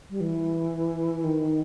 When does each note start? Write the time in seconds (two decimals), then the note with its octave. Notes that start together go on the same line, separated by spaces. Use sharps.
0.10 G3
0.20 E3
1.24 D#3